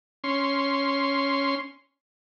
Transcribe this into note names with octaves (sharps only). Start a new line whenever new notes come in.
C#4 C6